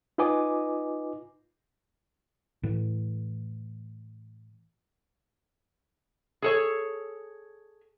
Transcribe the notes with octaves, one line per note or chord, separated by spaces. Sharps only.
D#4 F4 B4 D#5 G#5 D6
A2 E3
G#4 A4 C#5